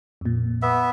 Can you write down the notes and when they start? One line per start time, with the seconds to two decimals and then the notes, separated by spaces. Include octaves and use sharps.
0.21 F2 A#2
0.62 B3 E5